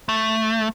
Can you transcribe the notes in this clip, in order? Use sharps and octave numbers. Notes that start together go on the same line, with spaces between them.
A3